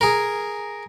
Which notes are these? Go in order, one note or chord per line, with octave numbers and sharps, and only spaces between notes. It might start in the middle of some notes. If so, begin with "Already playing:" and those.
G#4 A#4